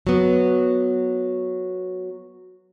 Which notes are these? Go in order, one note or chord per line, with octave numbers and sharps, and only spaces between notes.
F#3 B3